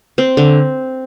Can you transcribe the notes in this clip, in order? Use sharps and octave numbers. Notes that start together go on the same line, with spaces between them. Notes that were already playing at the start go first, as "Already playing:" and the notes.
C4
D3